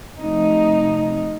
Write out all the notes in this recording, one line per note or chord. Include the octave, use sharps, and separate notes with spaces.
C3 F3 A3 D#4